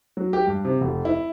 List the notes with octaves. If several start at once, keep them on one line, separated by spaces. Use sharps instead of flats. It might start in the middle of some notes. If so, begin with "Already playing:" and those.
F#3
G4
G2
C3
F1
E4